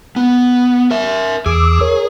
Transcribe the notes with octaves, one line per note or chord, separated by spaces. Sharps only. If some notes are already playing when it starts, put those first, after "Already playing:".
B3
A#4 E5
E2 G#4 D6 E6
A#4 C#5